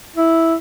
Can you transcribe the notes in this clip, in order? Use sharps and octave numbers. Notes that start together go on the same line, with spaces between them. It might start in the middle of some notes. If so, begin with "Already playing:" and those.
E4